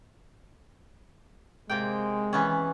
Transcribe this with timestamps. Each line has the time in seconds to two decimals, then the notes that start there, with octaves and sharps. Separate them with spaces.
1.70 C3 G#3 A#3 G5
2.33 E3 B3 C#4